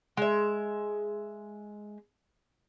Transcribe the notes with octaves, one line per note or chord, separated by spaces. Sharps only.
G#3 E5